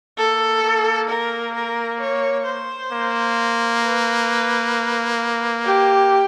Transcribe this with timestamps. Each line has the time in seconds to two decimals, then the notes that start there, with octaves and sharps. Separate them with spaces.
0.18 A#3 A4
0.64 A#3
1.10 A#4
1.55 A#4
2.01 C#5
2.47 C5
2.92 A#3
3.83 B4
5.65 G4